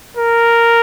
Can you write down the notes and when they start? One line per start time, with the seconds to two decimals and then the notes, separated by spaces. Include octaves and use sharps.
0.17 A#4